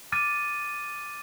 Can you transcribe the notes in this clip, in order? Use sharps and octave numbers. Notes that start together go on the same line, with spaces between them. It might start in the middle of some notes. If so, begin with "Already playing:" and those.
D6 F6 A6 D#7